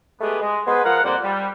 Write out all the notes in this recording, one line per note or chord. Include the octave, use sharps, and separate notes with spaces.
G#3 A3 B3 G4 G#4 B4
G#3
G#3 B3 G#4 B4 C5
F3 A#4 F5 F#5
F2 G3 A#3 C5 D5 F#5
G3